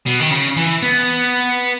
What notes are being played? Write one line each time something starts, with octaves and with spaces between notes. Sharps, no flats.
B2
D#3
C#3
E3
B3